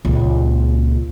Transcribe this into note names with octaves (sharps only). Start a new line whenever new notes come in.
C#2 A#2